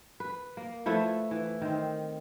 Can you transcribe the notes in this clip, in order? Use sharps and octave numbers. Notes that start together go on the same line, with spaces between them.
B4
A#3
F3 A3 E4 B4
E3
D#3 C4